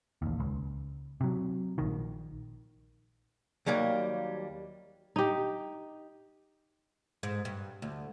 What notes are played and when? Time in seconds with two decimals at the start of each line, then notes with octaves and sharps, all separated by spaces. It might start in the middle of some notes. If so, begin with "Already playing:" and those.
0.22 A1 D#2
0.40 C#2
1.21 C3 F#3
1.78 A#1 D#3
3.66 D#2 F#3 G3 A#3
5.16 D#4 G4
7.23 G#2
7.45 G2
7.82 D2